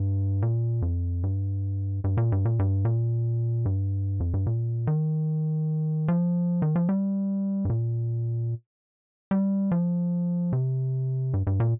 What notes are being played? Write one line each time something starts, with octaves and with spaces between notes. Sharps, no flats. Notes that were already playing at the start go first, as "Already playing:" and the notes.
Already playing: G2
A#2
F2
G2
G2
A#2
G2
A#2
G2
A#2
G2
F2
G2
A#2
D#3
F3
D#3
F3
G3
G2
A#2
G3
F3
C3
G2
G2
A#2